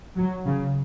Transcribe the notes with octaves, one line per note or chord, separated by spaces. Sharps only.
F#3
C#3